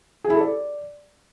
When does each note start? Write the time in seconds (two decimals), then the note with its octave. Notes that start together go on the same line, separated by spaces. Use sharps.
0.24 G#4
0.30 E4
0.35 A4
0.41 D5